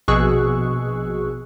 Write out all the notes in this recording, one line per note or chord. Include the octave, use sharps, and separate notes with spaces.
A#1 B2 G#4 C#6 E6 F#6